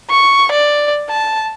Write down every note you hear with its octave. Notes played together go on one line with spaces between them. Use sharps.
C#6
D5
A5